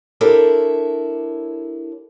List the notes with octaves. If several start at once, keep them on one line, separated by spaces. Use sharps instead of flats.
D4 E4 G4 A4 A#4 C#5